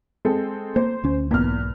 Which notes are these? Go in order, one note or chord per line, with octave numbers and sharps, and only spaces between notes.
G#3 C4 A4
A#3 C5
D2 C#4
B1 E2 G#2 A#3 F6